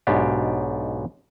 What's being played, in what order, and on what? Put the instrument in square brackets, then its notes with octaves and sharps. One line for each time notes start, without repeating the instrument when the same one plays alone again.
[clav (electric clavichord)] B1 G#2 B2 D4 G4